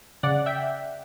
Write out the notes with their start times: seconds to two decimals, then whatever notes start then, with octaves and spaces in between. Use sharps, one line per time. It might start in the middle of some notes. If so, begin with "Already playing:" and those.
0.23 C#3 D5 F#5
0.46 E5 G5